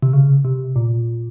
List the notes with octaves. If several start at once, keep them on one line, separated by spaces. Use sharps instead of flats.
C3
C#3
C3
A#2